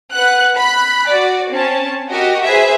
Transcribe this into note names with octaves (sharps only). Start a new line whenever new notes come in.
B4 F#5 F#6
B5 F#6
F#4 D5
C4 C#4 A5
F#4 G4 A#4 D#5
G#4 B4 C5 E5